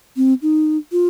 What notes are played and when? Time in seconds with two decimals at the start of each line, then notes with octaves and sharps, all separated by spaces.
0.17 C4
0.42 D#4
0.92 F4